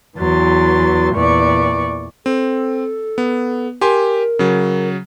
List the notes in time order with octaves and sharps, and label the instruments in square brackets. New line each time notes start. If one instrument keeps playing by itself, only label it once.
[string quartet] E2 E3 F#3 C6 A6
E2 A#2 E3 D5 C#6
[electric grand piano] C4 [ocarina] A4
[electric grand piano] B3
[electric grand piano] G4 G#5 C6 [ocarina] A#4
[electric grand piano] C#3 F#3